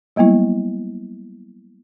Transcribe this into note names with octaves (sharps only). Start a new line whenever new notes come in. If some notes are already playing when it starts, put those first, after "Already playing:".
F#3 G3 A#3 B3 E4